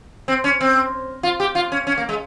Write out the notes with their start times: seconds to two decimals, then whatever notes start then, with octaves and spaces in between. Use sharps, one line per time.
0.28 C4
0.44 C#4
0.61 C4
1.23 F4
1.40 G4
1.55 F4
1.72 C#4
1.87 C#4
1.98 A#3
2.09 G#3